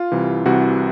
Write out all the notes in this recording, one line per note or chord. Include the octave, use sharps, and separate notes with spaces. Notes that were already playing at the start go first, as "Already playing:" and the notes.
Already playing: F4
C2 C3 E3
C2 C3 E3 F#4